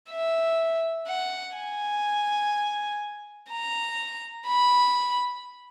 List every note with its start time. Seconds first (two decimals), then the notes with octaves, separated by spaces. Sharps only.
0.10 E5
1.07 F#5
1.56 G#5
3.50 A#5
4.47 B5